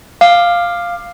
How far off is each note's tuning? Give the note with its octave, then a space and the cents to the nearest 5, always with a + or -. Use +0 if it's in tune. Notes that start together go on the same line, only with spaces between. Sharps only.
F5 +0 D6 +20